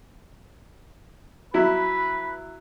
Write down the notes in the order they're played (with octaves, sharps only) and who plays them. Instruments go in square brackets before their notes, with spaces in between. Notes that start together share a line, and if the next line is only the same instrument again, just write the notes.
[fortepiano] F#3 E4 [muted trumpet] B4